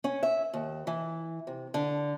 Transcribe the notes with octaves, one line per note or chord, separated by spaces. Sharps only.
C#4
E5
D#2
E3
C3
D3